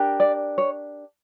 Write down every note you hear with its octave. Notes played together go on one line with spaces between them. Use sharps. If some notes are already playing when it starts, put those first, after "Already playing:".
Already playing: D4 G4 A#4
D5
C#5